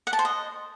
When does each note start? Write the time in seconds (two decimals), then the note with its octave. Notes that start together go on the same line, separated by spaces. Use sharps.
0.07 F#5
0.13 A5
0.19 C5
0.25 D#5